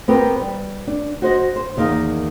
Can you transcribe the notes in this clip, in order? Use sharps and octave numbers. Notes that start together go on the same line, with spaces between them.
B3 C4 G4 A#4 B4
G3
D4
F#4 C5 D#5
C5
E2 D#3 A#3 D#5 F5